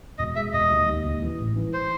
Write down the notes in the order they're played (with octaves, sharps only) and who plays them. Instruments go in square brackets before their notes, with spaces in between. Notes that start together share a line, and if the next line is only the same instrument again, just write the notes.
[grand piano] E1 [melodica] D#5
[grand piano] G#3 [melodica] E5
[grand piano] E1 [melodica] D#5
[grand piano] D#2
D#2
D#2
E3
A1
E3
[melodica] C5